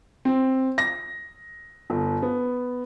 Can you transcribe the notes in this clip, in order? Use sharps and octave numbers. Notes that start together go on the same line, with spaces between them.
C4
A#6
G1
B3